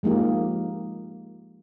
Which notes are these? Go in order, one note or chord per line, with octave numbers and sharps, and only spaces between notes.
F3 G#3 A#3 D#4 G4